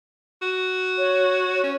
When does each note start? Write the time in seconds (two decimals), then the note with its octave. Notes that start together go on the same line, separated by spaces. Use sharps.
0.42 F#4
0.98 C#5
1.63 C#4